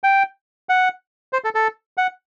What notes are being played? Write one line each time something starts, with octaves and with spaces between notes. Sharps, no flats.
G5
F#5
C5
A4
A4
F#5